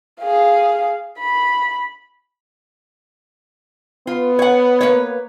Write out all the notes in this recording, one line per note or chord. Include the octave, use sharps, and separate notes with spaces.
G#4 F5
B5
B3 F4
C#5 F#5
A#3 B4 C#5